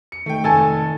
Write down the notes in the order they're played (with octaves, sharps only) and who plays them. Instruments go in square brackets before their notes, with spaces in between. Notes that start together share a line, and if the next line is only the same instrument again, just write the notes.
[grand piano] C#7
[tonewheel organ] D#3 [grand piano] A3 G5
[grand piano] F1 A3 A6 [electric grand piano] A4 G#5 A5